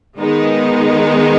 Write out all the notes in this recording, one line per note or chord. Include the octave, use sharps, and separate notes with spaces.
D#3 G#3 B3 D#4